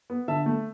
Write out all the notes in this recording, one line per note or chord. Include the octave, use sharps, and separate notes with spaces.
B3
D3 E5 A5
A3